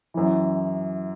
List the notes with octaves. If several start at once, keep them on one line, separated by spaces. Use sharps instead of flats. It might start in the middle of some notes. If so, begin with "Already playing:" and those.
F#2 E3